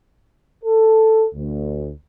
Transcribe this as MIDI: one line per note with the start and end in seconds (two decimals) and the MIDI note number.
0.64 1.27 69
1.35 1.91 38